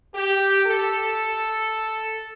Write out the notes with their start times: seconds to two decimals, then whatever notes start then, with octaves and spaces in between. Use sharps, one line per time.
0.14 G4
0.63 A4